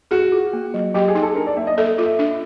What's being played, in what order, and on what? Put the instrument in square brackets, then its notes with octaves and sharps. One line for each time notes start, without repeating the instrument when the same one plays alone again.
[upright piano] F#4 [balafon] G#4
[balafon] F4
A#3
F#3
[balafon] F#3 [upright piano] G4
[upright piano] G#4
[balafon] D#4
[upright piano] A4
[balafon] D4 [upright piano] A#4
[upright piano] D5
[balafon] A#3 [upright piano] E5
[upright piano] D#5
[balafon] A4 [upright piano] E5
[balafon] F4
[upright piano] E5
[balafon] D4